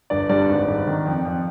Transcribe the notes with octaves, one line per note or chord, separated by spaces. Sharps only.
G1 D5
G2 D5
G#1
G#1
D#3
F2
F2